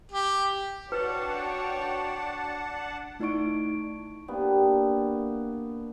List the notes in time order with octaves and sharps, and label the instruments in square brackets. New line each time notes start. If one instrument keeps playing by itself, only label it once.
[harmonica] G4
[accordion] D4 F#5 A5 [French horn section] F#4 [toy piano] B4 [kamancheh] C#5 G5
[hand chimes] A3 D#4 E4 D5 C#6 D7
[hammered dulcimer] A#3 B3 D4 G4